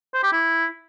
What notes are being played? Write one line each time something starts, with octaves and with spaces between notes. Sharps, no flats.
C5
G4
E4